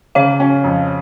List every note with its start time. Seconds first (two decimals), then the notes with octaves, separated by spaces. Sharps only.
0.15 C#3 C#5 F5
0.40 C#4
0.64 F2